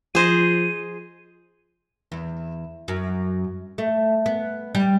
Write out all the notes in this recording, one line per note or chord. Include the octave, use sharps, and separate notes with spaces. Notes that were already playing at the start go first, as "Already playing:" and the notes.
F3 G#4 C5 D#5 D#7
E2
F#2
A3
B3
G3